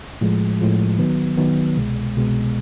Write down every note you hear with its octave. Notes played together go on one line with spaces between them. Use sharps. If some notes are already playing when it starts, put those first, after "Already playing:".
A2 F3 G#3
A2 F3 G#3
D#3 F#3 B3
D#3 F#3 B3
C2 B2 G#3
C2 B2 G#3